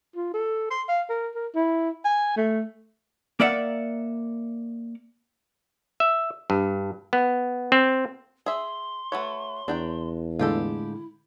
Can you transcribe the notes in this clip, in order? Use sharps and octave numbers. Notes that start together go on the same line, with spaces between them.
F4
A4
C6
F5
A#4
A#4
E4
G#5
A3
A#3 A#4 D5 E5 F#5
E5
G2
B3
C4
G#4 E5 C6
A3 F#4 B4 C#5
E2 D4 G5 A#5
A2 D3 G#3 E4 F4 G4 A4